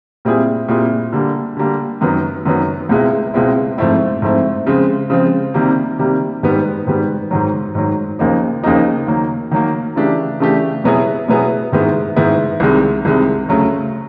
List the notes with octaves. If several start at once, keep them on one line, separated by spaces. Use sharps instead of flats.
A#2 G3 C4 E4 G#4
A#2 G3 C4 E4 G#4
D3 G3 A#3
D3 G3 A#3
F#2 D#3 F#3 B3
F#2 D#3 F#3 B3
C#2 B2 G#3 C4 E4
C#2 B2 G#3 C4 E4
G#2 F3 A3 C4 E4
G#2 F3 A3 C4 E4
C#3 F3 G#3 C4
C#3 F3 G#3 C4
C3 D#3 G3 A#3
C3 D#3 G3 A#3
G#2 D#3 G3 B3
G#2 D#3 G3 B3
G#2 D#3 F#3
G#2 D#3 F#3
D#2 C#3 F3 A#3 D#4
D#2 C#3 F3 A#3 D#4
D#3 F#3 A#3
D#3 F#3 A#3
C#3 E3 A3 D4 G4
C#3 E3 A3 D4 G4
B2 F#3 B3 E4 G#4
B2 F#3 B3 E4 G#4
G#2 D#3 G#3 B3 E4
G#2 D#3 G#3 B3 E4
C2 C3 D#3 G#3
C2 C3 D#3 G#3
D2 C#3 F#3 A3